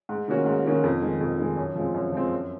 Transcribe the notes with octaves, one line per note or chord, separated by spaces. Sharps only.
G#2
D#3 A#3 C#4 F#4
G#2
D#3 A#3 C#4 F#4
F2
D#3 G#3
F2
D#3 G#3
F#2
F3 G#3 C4
F#2
F3 G#3 C4
F#2